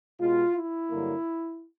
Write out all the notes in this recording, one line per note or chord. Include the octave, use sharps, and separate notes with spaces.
B2 G#3 F4
E4
G2 D3 F#3 A#3